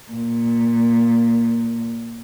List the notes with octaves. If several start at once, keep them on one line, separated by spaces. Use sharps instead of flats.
A#2